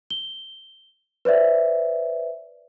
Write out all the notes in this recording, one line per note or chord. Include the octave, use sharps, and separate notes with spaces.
G7
B4 C5 D5 E5